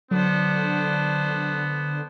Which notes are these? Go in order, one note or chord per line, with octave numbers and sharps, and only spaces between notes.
D3 F#3 B3 D4 C5